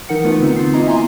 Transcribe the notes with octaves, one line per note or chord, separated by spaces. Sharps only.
E3 D#4 A#4 F#5 C#7
A3 B3 F4 B4
D3 C4 D#4
F4 C7
A#3 B3 E4 D#5 A#5
E5 G#5 A#5 C6